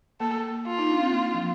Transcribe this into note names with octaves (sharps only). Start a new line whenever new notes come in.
A#3 A4
F4
D#4
D4
C4
A#3
F3